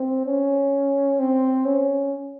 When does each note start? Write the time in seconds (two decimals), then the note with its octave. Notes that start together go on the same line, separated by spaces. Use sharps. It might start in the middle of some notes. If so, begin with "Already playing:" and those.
Already playing: C4
0.26 C#4
1.19 C4
1.66 C#4